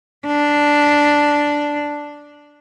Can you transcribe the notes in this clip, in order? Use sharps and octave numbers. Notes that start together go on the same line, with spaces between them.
D4